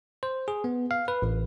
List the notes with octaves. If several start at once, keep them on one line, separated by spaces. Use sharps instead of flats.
C5
G#4
B3
F5
B4
A1